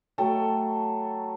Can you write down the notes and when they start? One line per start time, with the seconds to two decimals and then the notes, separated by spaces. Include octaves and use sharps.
0.18 F#3 A3 G5 A5